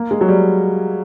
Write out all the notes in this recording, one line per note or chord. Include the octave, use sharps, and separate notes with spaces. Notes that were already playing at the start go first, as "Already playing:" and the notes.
Already playing: A#3
G#3
F#3
G3